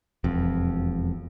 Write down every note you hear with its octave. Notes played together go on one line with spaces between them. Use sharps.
E1 F2